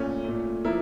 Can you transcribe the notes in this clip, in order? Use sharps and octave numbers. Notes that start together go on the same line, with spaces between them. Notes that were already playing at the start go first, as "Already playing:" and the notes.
Already playing: A#2 A3 C#4
A#2 A3
F3 A#3 E4